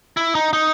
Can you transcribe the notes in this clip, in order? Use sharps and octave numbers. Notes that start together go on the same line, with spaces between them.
E4
D#4
D#4